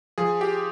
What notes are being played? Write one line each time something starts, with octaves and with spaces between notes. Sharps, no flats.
F3 G#4
G4